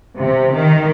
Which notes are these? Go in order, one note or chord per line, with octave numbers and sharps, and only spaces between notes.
C3
D#3